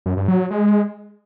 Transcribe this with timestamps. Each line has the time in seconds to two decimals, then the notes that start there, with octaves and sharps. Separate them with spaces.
0.06 F#2
0.17 G2
0.28 F#3
0.39 F#3
0.51 G#3